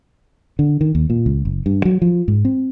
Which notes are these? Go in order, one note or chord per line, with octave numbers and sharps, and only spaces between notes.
D3
D#3
D#2
A#2
C#2
F#1
G2
F#3
F3
G#2
C4